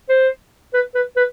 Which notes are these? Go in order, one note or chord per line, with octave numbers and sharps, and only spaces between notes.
C5
B4
B4
B4